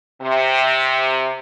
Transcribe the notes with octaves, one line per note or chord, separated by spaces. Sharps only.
C3